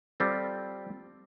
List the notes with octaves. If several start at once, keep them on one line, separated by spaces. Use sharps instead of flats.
G3 C4 F4 A4